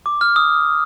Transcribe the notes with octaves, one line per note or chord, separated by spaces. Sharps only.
D6
F6
D#6